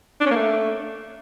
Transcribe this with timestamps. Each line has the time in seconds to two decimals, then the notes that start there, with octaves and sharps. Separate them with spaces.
0.21 D4
0.26 C#4
0.31 A#3
0.36 A3